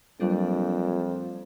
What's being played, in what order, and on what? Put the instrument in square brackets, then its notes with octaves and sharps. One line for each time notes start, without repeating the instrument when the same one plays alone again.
[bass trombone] F2 [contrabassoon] A#2 [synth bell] F#3 G3 D4